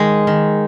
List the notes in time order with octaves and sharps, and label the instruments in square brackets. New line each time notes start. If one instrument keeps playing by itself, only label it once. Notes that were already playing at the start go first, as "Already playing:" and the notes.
Already playing: [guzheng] D#3 G#3
D#3